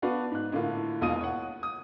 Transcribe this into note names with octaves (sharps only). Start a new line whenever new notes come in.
B3 D4 F#4 B4 D5 F5
G#2 F#6
A2 D3 A#3 F4
E1 D#2 F4 D#5 D#6 D#7
C#5 F#5
D#6